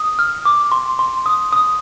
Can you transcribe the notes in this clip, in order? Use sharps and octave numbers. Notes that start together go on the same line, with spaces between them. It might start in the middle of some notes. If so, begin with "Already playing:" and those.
Already playing: D#6
F6
D6
C6
C6
D#6
D#6